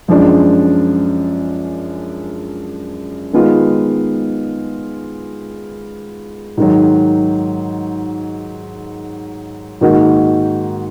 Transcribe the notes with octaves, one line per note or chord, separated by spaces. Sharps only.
F#2 F3 G#3 D4
D#3 G#3 B3 F4
G#2 D#3 F#3
G#2 D#3 A#3 D#4 F#4